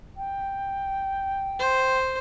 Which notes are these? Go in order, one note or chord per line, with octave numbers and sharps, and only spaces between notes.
G5
C5